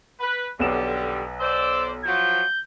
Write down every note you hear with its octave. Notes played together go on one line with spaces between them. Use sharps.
B4
B1 D3 G3 B3 E7
C5 D5 E6
F3 F#3 G6